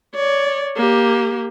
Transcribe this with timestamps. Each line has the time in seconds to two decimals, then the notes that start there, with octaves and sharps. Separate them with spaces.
0.14 C#5 D5
0.76 A#3 G4